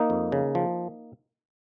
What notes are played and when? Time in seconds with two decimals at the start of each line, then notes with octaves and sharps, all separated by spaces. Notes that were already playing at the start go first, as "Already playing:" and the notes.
Already playing: A#3 D#4
0.10 F2
0.32 C#3
0.55 F3